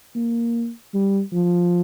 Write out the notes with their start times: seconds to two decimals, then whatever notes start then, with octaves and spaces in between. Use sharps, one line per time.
0.15 A#3
0.94 G3
1.33 F3